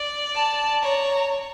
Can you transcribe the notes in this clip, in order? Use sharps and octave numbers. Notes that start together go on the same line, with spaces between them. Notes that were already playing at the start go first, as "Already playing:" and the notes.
Already playing: D5
A5
C#5 A#5